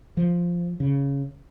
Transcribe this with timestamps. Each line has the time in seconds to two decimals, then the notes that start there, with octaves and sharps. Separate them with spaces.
0.17 F3
0.80 C#3